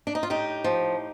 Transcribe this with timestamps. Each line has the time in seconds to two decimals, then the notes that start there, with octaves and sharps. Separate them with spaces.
0.07 D4
0.15 D#4
0.23 F4
0.30 A2 D#4 G4
0.64 F3